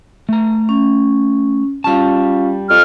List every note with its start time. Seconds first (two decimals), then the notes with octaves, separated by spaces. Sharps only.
0.29 A3 A#5
0.69 C#4
1.84 G3 C#4 F4 F5 A5
2.69 F2 F6